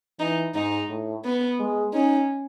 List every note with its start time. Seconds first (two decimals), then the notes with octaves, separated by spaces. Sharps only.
0.20 E3 D#4
0.54 G#2 D#4
0.89 A2
1.25 B3
1.59 G#3
1.94 C#4 D#4